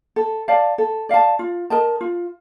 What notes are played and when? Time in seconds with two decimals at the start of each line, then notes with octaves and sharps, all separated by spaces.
0.16 A4
0.48 D5 F5 A5
0.78 A4
1.09 D5 F5 A5
1.39 F4
1.70 A#4 D#5 A5
2.01 F4